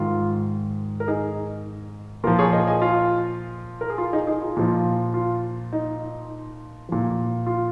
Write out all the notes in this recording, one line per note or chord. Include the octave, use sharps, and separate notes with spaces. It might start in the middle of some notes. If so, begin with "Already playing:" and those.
Already playing: G#2 D#3 F4
A#4
D#4 G#4
A#2 F3 F4 A#4
G#4 C#5
A#4 D#5
D#5 G#5
F4
A#4
G#4
F4
D#4 G#4
D#4 G#4
F4
A#2 F3
F4
D#4
A#2 F3
F4